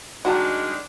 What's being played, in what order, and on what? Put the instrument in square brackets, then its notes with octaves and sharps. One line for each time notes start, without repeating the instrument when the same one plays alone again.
[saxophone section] D#3 G3 G#3 [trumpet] D4 [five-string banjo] F#4 [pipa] G5 A5 A#5